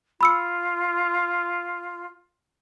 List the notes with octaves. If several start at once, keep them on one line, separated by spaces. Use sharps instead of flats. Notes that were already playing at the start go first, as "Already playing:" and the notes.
F4 B5 E6 C#7